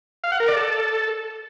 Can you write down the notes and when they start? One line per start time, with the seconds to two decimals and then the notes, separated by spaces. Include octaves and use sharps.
0.24 F5
0.32 F#5
0.40 A#4
0.48 D5
0.56 A4